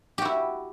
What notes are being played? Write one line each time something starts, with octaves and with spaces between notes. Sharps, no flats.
E4 F#4 G4